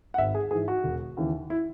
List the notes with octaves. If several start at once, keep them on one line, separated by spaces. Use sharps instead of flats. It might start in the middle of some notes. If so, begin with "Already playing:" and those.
F#5
G#1 E5
G#4
G#2 E3 G#4
F#4
E1
D#2 C#3 E3
E4